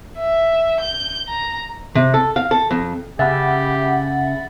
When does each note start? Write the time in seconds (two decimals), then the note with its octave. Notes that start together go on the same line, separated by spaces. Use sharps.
0.18 E5
0.81 G6
1.28 A#5
1.95 C3
2.14 A4
2.36 F5
2.51 A4
2.71 F2
3.19 C#3 G4 E5 F#5 B5 A6